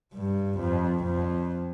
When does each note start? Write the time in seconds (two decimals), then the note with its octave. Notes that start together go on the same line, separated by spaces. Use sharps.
0.14 G2
0.59 F2
1.04 F2